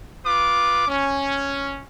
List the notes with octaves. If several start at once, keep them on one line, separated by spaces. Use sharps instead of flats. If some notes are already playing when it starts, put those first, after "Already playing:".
F4 B4 D6
C#4